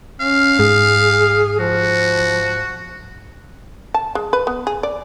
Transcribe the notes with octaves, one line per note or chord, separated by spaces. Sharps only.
C#4 F5
G#2 G#4
F3 F#4
A5
G#3
B4
B3
G#4
D5